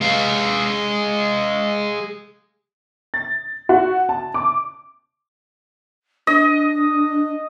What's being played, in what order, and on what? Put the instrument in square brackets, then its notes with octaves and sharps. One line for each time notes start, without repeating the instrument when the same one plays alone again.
[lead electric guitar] G#3 F5
[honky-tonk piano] A6
F#4
A5
D6
[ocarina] D4 [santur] D#5